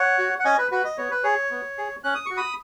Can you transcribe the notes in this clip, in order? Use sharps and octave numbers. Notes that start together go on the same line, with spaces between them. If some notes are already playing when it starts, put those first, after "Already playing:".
Already playing: C#5 F#5
F#4
F#5
C#4 D#5 G#5
B4
F#4 B4
D#5
B3 C#5
B4
G#4 C#5
B3
G#4
C#4 F#6
D#6
F#4 C#6
B5 D#6